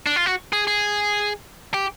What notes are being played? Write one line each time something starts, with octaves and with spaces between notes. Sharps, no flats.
D4
F4
F#4
G#4
G#4
G4